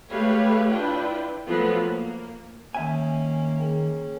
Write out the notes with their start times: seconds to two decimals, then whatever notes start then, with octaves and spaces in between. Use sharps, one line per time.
0.11 G#3 A3 G4 B4 C#5 F5
0.71 D4 E4 F4 B4 G5
1.48 F3 F#3 A3 B3 F4 B4
1.85 A#3
2.75 D#3 A#3 C#4 E5 G#5
3.59 G#4 A#4 G5